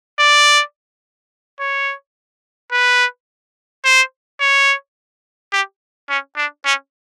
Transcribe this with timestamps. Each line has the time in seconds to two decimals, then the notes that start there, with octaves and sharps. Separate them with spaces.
0.19 D5
1.60 C#5
2.72 B4
3.85 C5
4.40 C#5
5.53 G4
6.09 C#4
6.37 D4
6.65 C#4